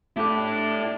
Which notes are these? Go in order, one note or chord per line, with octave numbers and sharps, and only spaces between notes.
A3 D4 E4 G4 A4 F#6